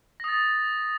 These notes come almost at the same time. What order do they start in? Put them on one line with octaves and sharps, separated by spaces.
A#6 D#6 A6